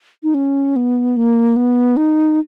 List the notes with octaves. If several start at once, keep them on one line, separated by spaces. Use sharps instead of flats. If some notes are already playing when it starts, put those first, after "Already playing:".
D#4
C#4
B3
A#3
B3
D#4